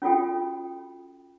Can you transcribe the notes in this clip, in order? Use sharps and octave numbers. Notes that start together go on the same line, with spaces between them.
C#4 F4 F#4 A4 G5